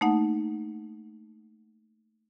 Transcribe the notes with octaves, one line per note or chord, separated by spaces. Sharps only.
A3 A#3 D#4 F#5